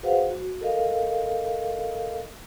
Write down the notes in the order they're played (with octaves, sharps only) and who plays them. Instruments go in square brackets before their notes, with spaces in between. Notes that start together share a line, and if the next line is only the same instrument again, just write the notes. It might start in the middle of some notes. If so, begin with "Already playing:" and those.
[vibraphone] F#4 G#4 B4 C5 F5 F#5
F#4
A4 A#4 D#5 F5